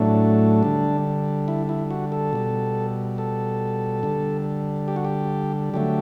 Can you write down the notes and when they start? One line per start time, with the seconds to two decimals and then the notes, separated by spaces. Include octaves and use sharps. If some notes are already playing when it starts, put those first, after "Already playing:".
Already playing: A2 F#3 A3 D4
0.63 D3 G3
1.48 E4
1.69 E4
1.91 F#4
2.12 A4
2.33 B2 G3
3.18 A4
4.03 D3 G3
4.88 G4
4.96 F#4
5.05 G4
5.74 D3 F#3 A3 G4